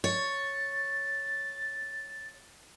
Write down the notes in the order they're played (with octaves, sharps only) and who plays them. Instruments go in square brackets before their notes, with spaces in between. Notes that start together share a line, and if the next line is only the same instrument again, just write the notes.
[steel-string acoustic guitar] C#5 [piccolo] A6